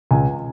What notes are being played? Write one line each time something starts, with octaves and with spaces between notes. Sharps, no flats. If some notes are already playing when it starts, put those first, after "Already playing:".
C#2 G#5